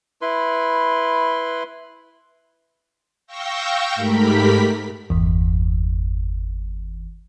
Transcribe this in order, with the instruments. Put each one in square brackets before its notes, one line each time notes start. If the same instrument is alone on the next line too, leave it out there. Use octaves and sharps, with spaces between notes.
[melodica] E4 B4 B5 C6
[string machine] F5 G5 C#6 E6 G6 A#6
G#2 A3 G4 A#4 B5 B6
[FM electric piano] G1 E2